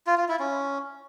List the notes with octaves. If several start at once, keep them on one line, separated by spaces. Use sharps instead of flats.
F4
F4
E4
C#4